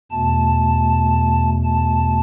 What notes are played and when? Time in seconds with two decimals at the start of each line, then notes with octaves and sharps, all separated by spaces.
0.11 E2 B2 A3 A5
1.65 A5